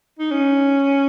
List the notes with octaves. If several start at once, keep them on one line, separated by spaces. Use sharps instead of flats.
D#4
C#4